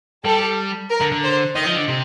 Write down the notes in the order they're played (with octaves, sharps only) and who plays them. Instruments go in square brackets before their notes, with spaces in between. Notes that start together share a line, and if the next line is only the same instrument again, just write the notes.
[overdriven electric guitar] G3 [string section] A4
[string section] A#4
[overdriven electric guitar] D3
D3
[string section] C5
[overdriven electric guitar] D#3 [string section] D#5
[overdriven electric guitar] F3
D3
C3